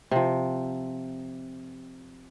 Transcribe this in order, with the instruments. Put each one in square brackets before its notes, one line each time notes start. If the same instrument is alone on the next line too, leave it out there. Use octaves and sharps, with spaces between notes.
[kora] C3 F3